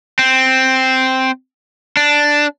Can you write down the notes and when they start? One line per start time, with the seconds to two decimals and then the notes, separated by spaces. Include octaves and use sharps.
0.19 C4
1.97 D4